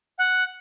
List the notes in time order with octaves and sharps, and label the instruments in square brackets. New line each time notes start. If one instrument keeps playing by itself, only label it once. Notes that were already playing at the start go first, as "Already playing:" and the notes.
[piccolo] F#5